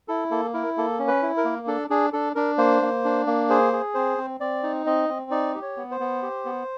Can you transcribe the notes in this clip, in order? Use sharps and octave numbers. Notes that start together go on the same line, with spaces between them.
E4 A4
A#3 A4
E4 A#4
A#3 A4
C#4
B4
E4
A#4
A#3
D4 A4
D4 G#4
D4 A4
D4 A#4
A#3 C5
A#3
D4
A#3
G#4 C5
G#4
C4 C5
C4
C4 D5
D#4
C4 D#5
C4
D#4 D5
G4
C#5
B3
C5
B3
G4
B3